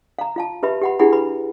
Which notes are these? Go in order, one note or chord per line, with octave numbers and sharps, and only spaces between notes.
F5 A#5
F4 F5 A5
G4 B4 E5 B5
G4 F#5 B5
D4 E4 G4 G#4 F#5 B5
B4 B5